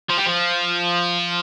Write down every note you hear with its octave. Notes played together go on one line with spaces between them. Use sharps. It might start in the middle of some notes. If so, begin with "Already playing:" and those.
F3
G3
F3